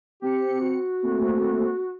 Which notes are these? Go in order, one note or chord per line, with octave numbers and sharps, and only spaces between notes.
C4 G4 C#7
F#4
A3 A#3 C4